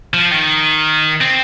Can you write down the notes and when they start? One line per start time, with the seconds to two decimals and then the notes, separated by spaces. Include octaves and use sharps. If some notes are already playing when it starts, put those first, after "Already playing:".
0.14 F3
0.31 D#3
1.21 C4